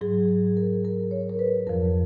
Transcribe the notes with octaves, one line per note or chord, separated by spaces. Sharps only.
G#2 F#3 G#4
G#4
A#4
A#4
C#5
A#4
B4
F2 F3 A#4